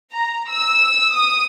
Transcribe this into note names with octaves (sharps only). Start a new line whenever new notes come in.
A#5
E6
D#6